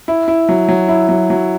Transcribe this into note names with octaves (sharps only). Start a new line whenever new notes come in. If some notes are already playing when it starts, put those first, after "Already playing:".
E4
E4
F#3
F#3
E4
F#3
F#3